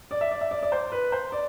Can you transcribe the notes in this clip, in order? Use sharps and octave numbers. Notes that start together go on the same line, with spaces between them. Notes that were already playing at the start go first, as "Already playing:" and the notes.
D5
E5
D5
E5
D5
D5
C5
B4
C5
D5